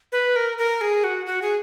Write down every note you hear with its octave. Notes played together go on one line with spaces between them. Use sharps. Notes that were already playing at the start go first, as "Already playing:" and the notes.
B4
A#4
A#4
G#4
F#4
F#4
G#4